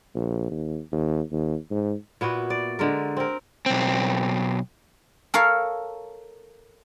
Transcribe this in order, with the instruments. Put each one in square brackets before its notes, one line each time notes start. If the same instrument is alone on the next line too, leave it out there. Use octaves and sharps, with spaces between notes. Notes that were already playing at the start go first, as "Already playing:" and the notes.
[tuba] A#1
D#2
D#2
D#2
G#2
[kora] A#2 B3 E4 F#4
D5
D3 G#3 A#4
C4 A#4
[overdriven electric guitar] B1 C4
[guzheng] A4 A#4 C#5 F5